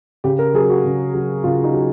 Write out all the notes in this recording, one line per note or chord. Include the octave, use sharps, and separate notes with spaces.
C#3 G4
A#4
F#3 G#4
F#4
C#3
F#3
C#3 F4
D#4
F#3